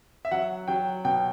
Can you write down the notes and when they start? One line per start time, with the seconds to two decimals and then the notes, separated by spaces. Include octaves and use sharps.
0.25 E5
0.32 F#3 F#5
0.68 F#3 G5
1.05 B2 G5